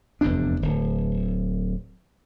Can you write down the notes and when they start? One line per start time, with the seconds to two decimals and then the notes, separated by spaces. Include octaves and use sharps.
0.21 F1 E2 G2 D4
0.62 D1